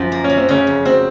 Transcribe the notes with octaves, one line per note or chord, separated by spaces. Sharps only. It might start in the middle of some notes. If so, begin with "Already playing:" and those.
Already playing: F#2 F3
A#3
C#4
F#3
C4
C#3 C#4
F2
C4 F#4